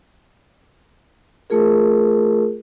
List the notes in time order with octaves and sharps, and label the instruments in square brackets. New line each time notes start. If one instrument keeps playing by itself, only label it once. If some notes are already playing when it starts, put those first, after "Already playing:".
[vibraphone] A3 F4 G#4 A#4